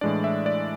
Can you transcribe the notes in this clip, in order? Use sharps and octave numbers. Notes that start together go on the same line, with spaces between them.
A2 E3 G#3 D4 D5
E5
D5